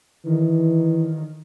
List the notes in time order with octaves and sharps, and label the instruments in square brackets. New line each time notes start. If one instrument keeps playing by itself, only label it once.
[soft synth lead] D#3 [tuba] E3